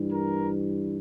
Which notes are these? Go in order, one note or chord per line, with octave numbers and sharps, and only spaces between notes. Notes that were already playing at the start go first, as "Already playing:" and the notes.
Already playing: G2 E3 G3
A#4